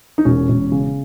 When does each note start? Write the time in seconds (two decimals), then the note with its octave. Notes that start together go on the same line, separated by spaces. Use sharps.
0.18 D#4
0.25 E1 C#4
0.49 E1
0.72 C#3